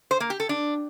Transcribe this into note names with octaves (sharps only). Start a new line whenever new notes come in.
C5
A#3
G4
A4
D4